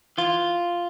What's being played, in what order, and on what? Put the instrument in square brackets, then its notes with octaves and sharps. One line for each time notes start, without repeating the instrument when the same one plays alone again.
[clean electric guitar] E3 F4